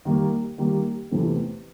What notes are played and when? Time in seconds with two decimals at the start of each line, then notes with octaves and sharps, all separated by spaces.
0.05 D#3 G3 A#3
0.58 D#3 G3 A#3
1.11 E2 C3 E3 A3 C4